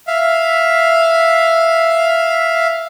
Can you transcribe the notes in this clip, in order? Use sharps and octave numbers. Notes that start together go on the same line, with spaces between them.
E5 F5